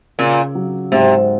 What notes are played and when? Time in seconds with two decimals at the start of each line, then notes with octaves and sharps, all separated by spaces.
0.19 A#2 C#3
0.55 F#3
0.92 G#2 C3